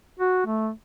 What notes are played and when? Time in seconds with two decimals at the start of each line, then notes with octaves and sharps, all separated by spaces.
0.19 F#4
0.46 A3